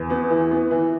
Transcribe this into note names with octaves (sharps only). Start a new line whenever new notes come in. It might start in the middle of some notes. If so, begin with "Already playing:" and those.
Already playing: E2
B3
E3
B3
E3